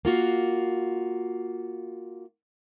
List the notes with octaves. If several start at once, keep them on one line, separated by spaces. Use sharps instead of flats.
A#3 F4 F#4